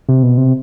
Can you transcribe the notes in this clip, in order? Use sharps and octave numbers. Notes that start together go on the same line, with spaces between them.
C3
B2
C3